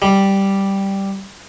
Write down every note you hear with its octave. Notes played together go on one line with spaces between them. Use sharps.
G3